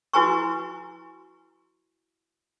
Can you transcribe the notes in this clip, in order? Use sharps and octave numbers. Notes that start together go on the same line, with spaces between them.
E4 F#4 B4 G#5 A#5 C#6